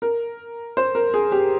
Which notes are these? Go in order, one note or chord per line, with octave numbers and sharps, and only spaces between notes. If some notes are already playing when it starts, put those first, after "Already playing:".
A#4
C5
A#4
G#4
G4